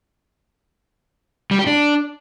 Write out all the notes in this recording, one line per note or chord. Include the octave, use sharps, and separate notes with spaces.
G3
G4
D4